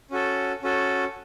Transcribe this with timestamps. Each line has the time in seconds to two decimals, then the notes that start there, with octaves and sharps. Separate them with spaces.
0.11 C#4 F#4 A4
0.63 C#4 F#4 A4